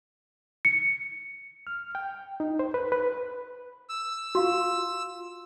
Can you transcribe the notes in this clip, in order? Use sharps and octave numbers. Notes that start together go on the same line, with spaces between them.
C#7
F6
G5
D#4
C5
B4
B4
E6
F4 F#4 F5 C6